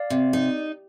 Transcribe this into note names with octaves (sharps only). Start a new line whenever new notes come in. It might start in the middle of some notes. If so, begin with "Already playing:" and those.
Already playing: D5 F5
C3
D#4